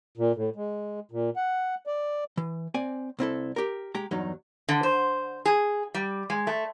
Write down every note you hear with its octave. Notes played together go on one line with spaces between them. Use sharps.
A#2
A2
G#3
A#2
F#5
D5
E3
C4 D5 G#5
C2 C4 E4 A4
G4 A#4
G#3 G4 A#5
E2 G2 F#3 D#4
D3
C5
G#4
G3
G#3
A3